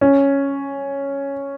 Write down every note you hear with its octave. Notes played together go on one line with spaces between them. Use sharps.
C#4